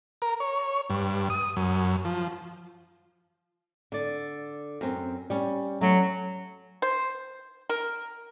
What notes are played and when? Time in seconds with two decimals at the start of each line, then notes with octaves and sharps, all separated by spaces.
0.22 A#4
0.40 C#5
0.90 G2
1.30 D#6
1.56 F#2
2.05 F3
3.92 D3 D5
4.81 F#2 C4
5.30 G3 C#4
5.81 F#3 A3 C#4
6.82 C5
7.69 A#4